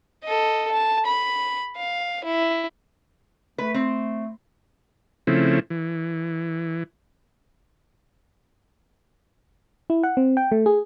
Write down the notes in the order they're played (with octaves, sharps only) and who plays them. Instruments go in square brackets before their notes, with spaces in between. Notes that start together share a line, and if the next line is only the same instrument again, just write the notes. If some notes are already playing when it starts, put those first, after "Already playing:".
[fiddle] A4 D#5
A5
B5
F5
E4
[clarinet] A3 [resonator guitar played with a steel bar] B4
[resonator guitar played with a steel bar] C4
[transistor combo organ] C#3 F3 A3 C4 E4
E3
[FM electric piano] E4
F#5
C4
G5
A3
G#4